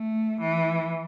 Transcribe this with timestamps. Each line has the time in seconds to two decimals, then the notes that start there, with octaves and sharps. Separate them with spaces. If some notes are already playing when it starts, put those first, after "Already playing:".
Already playing: A3
0.40 E3